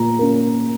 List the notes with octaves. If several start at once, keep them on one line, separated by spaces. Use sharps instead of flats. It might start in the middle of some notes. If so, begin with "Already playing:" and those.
Already playing: A#2 A#5
A#3 C#4